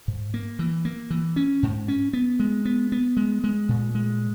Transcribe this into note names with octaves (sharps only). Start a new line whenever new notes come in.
G#2
A#3
E3
A#3
E3
C#4
G#2
C#4
B3
G#3
B3
B3
G#3
G#3
A#2
G#3